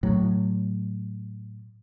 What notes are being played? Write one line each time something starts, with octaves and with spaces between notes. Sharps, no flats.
A2 F#3